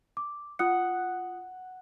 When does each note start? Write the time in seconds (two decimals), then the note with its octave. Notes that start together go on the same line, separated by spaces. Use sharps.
0.17 D6
0.59 F4 F#5 D#6 C#7